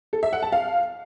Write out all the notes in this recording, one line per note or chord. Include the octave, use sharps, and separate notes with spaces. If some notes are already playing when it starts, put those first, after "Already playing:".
A4
E5
F#5
A5
F5